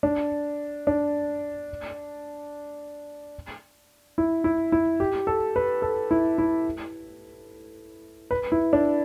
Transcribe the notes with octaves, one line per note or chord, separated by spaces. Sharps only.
D4
D4
E4
E4
E4
G4
A4
B4
A4
E4
E4
B4
E4
D4